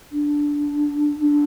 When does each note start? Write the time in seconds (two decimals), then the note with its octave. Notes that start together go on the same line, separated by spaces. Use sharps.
0.12 D4
1.20 D4